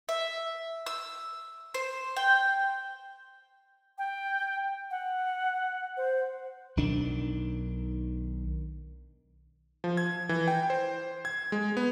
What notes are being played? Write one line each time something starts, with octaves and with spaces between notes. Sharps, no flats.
E5
E6
C5
G5
G5
F#5
C5
B1 D#3 D4
F3
G#6
E3
G5
C5
G#6
G#3
B3